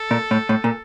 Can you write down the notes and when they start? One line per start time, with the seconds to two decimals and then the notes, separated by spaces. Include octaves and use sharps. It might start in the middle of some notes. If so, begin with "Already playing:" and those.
Already playing: A4
0.11 A#2
0.31 A2
0.49 A2
0.64 A#2